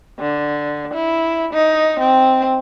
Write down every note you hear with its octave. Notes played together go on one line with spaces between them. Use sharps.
D3
E4
D#4
C4